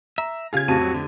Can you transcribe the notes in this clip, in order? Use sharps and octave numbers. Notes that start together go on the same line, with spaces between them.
E5 A#5
C#3 F4 G4 G#4 G#6
F2 A2 F#4 G4 A5 D#7
F#3
D3